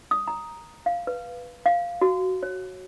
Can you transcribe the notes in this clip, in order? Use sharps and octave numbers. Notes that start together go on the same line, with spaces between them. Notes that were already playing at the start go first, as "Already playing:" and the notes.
D#6
A#5
F5
B4
F5
F#4
C#5